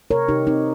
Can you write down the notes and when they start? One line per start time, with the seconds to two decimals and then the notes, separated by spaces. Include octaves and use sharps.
0.11 C3 A#4 C#5
0.28 C3 D#4 G4
0.46 C3 C4 D#4